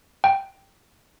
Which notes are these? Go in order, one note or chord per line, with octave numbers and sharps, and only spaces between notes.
G5